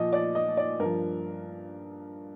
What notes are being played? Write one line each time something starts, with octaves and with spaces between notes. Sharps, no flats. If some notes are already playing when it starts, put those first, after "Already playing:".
Already playing: A#2 F3 D#5
D5
D#5
D5
G2 F3 A#4